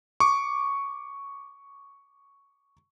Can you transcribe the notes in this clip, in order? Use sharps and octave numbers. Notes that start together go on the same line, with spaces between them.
C#6 D6